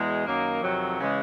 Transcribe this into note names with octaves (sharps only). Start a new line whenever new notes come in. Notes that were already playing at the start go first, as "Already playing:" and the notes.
Already playing: E2 B2 G#3
F#2 D#3 F#3 A#3
F2 C3 D#3 F#3
C#3 E3 G#3